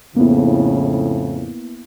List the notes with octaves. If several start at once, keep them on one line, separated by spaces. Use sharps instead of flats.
F2 A2 C#3 A#3 B3 E4